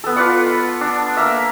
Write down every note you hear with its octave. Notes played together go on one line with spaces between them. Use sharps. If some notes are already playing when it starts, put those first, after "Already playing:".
B3 A4
F4 B4 D5 F#5
B5
D4
A#3 E5